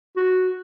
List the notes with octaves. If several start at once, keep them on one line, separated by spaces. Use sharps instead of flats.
F#4